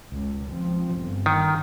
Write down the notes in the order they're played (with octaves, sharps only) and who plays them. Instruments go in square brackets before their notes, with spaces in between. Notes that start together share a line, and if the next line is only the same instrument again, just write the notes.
[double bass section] C#2
F3 C4
G1
[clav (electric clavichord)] D#3